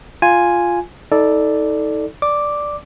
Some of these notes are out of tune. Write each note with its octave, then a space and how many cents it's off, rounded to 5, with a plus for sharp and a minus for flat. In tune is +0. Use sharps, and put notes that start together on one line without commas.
F4 +0 G#5 +0
D#4 +30 A4 +0 D5 +0
D5 +0 D6 +0